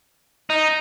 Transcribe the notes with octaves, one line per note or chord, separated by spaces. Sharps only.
D#4